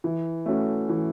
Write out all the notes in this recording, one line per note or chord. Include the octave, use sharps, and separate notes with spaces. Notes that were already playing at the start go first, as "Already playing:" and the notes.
E3
A3 C#4 F#4
E3